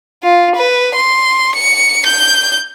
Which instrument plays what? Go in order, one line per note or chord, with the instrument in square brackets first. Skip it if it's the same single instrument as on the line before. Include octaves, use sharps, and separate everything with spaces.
[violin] F4
B4
C6
C#7
G6